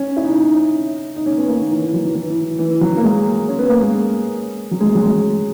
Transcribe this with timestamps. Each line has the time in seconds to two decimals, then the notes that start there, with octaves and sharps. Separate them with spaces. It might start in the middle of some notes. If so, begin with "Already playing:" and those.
Already playing: C#4
0.17 E4
0.24 D#4
0.32 C#4
0.40 D#4
1.16 D#4
1.26 C#4
1.37 B3
1.48 A#3
1.60 D#3
1.71 E3
1.82 E3
1.93 F#3
2.05 E3
2.15 E3
2.59 E3
2.81 F#3
2.97 A#3
3.03 G#3
3.48 C#4
3.59 B3
3.69 A#3
3.81 G#3
4.71 F#3
4.80 G#3
4.95 F#3
5.02 G#3